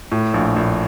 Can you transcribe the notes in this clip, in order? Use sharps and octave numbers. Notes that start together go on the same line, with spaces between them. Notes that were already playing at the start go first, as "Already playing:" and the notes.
A2
A#1
A#1